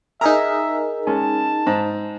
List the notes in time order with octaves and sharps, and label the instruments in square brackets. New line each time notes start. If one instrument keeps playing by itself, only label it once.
[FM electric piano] D#4 G#4 A#4 [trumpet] E5 [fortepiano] A#5
[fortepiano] G#3 C#4 [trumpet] A5
[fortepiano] G#2